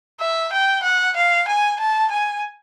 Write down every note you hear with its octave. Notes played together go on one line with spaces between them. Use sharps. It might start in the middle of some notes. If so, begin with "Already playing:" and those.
E5
G5
F#5
F5
G#5
A5
G#5